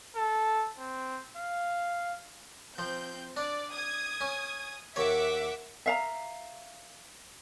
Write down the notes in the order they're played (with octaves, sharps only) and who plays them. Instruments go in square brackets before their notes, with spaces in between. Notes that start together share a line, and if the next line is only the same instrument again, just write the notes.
[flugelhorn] A4
C4
F5
[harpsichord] F3 [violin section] C4 G6
[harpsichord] D4 [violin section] D5
[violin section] D#6 G#6
[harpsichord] C#4
[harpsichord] D#2 C#5 [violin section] E5 F#5 D6
[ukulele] E5 F5 A#5